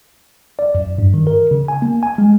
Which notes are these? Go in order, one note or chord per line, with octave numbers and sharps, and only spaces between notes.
D5
F#2
G2
D#3
A#4
C#3
G#5
A#3
G#5
G#3